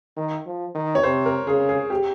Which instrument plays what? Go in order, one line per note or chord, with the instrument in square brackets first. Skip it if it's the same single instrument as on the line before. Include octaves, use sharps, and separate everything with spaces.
[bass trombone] D#3
F3
D#3
[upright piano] C#5
[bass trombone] C3 [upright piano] C5
[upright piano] A#4
[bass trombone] C#3 [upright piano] G#4
[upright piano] G#4
G4